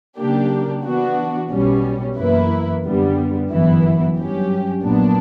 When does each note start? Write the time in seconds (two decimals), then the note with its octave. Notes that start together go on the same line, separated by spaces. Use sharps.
0.18 C#3 F#3 A#3 D4 G4
0.84 E3 B3 D4 F#4
1.51 B1 B2 G3 C#4
2.18 F#2 E3 A#3 E4 B4
2.85 F#2 D3 G3 B3
3.50 G1 F#2 E3 B3 E4
4.17 G2 F#3 C#4 G4
4.84 A#1 A#2 F#3 B3 D4